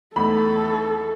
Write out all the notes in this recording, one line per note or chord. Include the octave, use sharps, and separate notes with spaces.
E2 A3 D#4 A4 B5